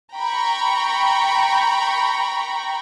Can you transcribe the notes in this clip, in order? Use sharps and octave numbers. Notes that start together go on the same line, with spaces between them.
G5 A#5 B5 C#6